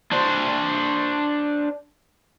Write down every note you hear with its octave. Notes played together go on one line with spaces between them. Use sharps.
D4 C5